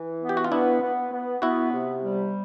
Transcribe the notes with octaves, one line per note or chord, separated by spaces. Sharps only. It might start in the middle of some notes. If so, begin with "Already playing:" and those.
Already playing: E3
B3
G4
F#4
F4
B3 D4 E4
B3
B3
B3 E4 F#4
C3
G3